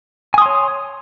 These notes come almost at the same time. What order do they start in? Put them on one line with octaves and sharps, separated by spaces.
G#5 D#6 C6 C#5